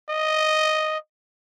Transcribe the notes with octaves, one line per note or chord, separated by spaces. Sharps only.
D#5